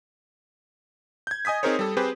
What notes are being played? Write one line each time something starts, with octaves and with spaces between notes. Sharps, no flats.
G6 G#6
D#5 G#5 D#6 G#6 B6
C4 D#4 G#4 A#4 C5 C#5
G3 A4
C4 G4 G#4 B4 C5